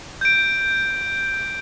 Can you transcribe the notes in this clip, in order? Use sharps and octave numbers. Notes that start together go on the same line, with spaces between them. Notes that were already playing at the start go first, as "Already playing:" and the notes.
G6 D7